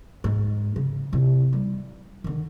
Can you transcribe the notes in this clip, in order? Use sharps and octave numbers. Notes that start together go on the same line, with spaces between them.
G#2
C#3
C3 E4
G3
D3 D#3